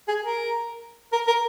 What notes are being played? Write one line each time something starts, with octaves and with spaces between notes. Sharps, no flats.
G#4
A#4
A#4
A#4